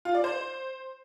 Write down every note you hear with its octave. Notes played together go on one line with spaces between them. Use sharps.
F4
D5
C5